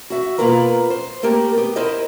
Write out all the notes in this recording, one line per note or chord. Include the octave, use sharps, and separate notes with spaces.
F#4 E5
B2 A#3 F4 A#4 B4 A#5
C5
A3 A#3 G4 A#4
B3 G4
E4 A#4 C5 D#5